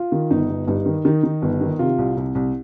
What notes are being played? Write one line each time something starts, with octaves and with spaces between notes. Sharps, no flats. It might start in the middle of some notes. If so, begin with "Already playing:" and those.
Already playing: F4
D#3
G1 D#4
G1
G2 D#4
D#3
D#3 D#4
D#3
G1
D#3
C3 F4
C2
C2
C2